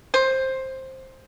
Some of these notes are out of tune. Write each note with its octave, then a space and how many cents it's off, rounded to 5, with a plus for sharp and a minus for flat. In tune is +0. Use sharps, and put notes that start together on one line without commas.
C5 +10